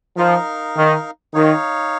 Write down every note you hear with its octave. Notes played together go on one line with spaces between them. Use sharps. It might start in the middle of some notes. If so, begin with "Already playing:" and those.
F3 D#4 A#4 F5
D#3
D#3 D#4 C#5 F5